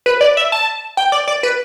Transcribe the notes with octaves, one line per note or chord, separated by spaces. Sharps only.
B4
D5
E5
A5
G5
D5
D5
B4